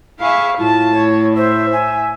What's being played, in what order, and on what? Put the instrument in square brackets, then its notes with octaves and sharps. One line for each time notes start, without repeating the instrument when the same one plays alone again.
[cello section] E4 G#4 E5 [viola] F5 C#6
[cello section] A2 [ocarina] E4 [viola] F4 A5
[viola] C#5
[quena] C5 [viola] E5
[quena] G#5